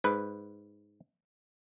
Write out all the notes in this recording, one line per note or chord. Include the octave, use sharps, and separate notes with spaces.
G#2 B4